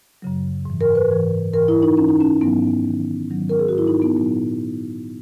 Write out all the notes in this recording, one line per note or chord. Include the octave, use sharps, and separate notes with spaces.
F#2 C#3 F#3
G#2 E3
A#4
B4
G#2 E3
G#2 E3 A#4
E4
D#4
G#2 E3 C#4
D#4
C#4
G#2 D#3 F#3 B3
G#2 D#3 F#3
G#2 D#3 F#3
A#4
G#4
F#4
G#2 D#3 F#3 E4
D#4
B3
A#2 F#3